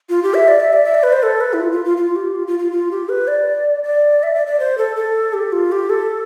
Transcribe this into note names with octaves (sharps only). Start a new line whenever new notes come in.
F4
G4
E5
D5
E5
D5
E5
D5
B4
C5
A4
B4
E4
F4
F4
F4
F4
G4
F4
F4
F4
F4
G4
B4
D5
D5
E5
D5
D5
C5
A4
A4
G4
F4
G4
A4